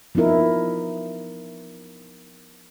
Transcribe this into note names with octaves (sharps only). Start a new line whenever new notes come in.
F3 B3 D#4 E4 A#4